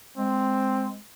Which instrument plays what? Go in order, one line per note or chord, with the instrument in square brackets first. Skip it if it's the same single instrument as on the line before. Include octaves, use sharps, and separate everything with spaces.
[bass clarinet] G#3 [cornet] C4